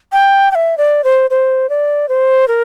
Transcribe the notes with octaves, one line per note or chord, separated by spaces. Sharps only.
G5
G5
E5
D5
C5
C5
D5
C5
A#4